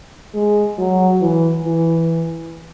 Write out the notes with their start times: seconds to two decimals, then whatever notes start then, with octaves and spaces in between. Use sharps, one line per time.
0.34 G#3
0.78 F#3
1.21 E3
1.65 E3